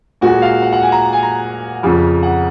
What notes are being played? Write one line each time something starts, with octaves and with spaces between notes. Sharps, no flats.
A#2 G#3 F#4
F5
F#5
F#5
G#5
A#5
G#5
A#5
F2 C#3 F3
F#5